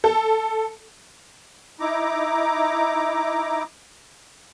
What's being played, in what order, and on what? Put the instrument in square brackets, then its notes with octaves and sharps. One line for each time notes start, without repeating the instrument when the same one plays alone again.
[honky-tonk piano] A4
[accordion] D#4 E4 A#5 D6